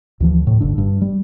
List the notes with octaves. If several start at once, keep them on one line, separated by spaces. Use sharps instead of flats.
D2 E3 F3
A2 C3
G1 G2 D3 D4
G2
G3